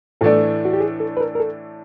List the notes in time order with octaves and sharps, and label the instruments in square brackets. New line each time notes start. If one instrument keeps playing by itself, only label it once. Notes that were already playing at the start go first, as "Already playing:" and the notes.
[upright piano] A2 E3 A3 D4 [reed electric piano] A4
[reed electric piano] F#4
G4
G#4
A4
B4
A#4
A#4
A4